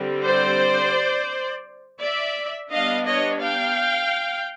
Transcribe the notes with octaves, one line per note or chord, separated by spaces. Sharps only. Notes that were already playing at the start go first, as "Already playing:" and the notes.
Already playing: D3 G3 C4
C5 D5
D5 E5
G3 B3 D4 D#5 F5
C#5 D#5
F5 G5